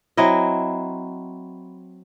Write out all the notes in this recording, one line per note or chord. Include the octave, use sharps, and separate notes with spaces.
F#3 C4 E4 D#5